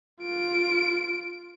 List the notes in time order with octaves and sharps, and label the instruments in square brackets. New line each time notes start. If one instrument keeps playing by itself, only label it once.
[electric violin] F4 D7